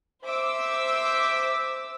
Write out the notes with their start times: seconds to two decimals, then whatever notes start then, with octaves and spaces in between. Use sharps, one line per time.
0.23 C5 E5 D6 E6